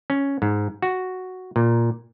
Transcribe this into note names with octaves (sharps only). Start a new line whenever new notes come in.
C#4
G#2
F#4
A#2